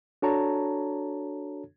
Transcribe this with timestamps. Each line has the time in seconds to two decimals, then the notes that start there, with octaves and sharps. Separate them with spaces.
0.22 D4 F#4 A4 C#5 A5 A#5